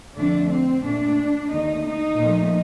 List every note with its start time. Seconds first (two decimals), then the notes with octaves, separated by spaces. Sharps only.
0.16 F2 D3 A3 D4
0.50 C4
0.84 A#2 A3 D4
1.51 D#2 D3 A3 D#4
1.85 D#4
2.19 A#2 F3 A3